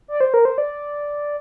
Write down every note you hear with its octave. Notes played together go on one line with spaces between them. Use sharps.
D5
C5
A#4
C5
D5